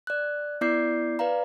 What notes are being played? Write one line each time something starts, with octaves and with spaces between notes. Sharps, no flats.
D5 F#6
B3 E4 D5 D6 G6 C7
B4 D5 F5 A#5